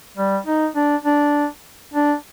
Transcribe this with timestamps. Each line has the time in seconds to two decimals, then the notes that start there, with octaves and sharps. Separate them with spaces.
0.17 G3
0.46 D#4
0.76 D4
1.05 D4
1.94 D4